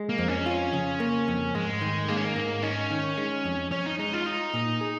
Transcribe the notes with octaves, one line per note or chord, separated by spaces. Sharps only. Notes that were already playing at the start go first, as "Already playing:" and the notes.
Already playing: G#3
A#3
F2
C#4
F4
C#3
A#3
F2
G#2 G#3
D#3
G#3 A#3
C#4
A#3
G#2
C#4 D#4
D#3
G#3
F2
C#4 C#5
D#4
G#3 D#4
F4
D#4 F4
A#2
G#4